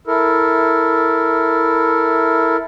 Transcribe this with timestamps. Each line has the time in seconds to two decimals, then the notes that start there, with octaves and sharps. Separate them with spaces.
0.07 E4 A4 A#4